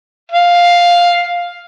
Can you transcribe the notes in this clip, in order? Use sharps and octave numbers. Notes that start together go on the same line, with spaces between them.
F5